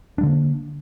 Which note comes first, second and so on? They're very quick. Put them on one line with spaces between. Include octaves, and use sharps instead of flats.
D4 G3 D3 A#3